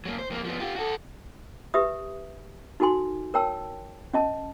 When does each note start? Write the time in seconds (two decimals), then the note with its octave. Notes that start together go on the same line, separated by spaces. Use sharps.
0.05 F#3 A#3
0.19 C5
0.30 F2 A#3
0.44 F3 B3
0.60 F4 G4
0.76 F#4 A4
1.74 G4 B4 E5 D#6
2.80 D#4 F#4 A4 G#5 C6
3.34 A#4 C#5 G5 A5 E6
4.14 C#4 D#5 A5